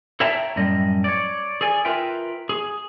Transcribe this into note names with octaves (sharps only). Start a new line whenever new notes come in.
A4 C#5 E5 G5 A5 A#5
F#2 A2 G3 D#5
C#5 D5
G#4 A4 D5 G#5
F4 A#4 B4 E5 G5
G#4